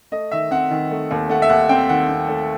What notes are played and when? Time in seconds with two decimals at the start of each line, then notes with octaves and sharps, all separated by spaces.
0.12 A3 D#5
0.31 D#3 E5
0.51 C4 F#5
0.71 D#3
0.91 A3
1.11 D#2
1.29 A3 F#5
1.42 E5
1.49 D#2 F#5
1.69 C4 G5
1.89 D#3 F#5
2.09 C4
2.29 A3